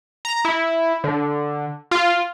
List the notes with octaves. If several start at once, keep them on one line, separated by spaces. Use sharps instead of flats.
A#5
E4
D3
F4